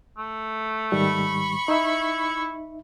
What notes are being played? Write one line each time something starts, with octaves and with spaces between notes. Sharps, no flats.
A3
G#2 D#3 G3 B5 C#6
D#4 E4 E5